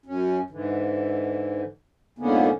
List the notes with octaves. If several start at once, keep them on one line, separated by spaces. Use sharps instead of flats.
F#2 C#4
G#2 D3 E3
F2 G#2 D3 A#3 B3 C#4